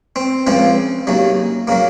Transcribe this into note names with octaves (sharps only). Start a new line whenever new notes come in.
C4
C#2 C#3 F3 C4
D#2 C#3 F#3
C#3 F#3 A#3